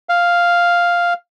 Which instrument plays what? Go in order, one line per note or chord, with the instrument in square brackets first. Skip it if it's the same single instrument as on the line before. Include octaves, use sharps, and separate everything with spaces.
[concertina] F5